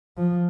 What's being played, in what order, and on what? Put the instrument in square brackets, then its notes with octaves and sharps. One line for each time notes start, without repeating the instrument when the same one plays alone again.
[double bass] F3